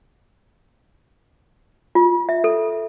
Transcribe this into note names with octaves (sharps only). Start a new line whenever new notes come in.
F4
E5
A4